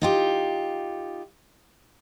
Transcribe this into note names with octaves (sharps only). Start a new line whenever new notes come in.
D#4 F4 G4